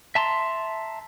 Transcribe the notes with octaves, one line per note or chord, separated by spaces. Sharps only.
E5 A5 A#5 C6